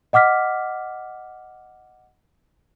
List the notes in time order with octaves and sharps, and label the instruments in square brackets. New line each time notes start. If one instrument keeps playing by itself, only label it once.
[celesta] D#5 F#5 D6 F6 B6